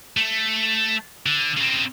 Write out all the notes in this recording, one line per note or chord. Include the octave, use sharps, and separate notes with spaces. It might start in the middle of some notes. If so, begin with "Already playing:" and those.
A3
D3
C#3 C4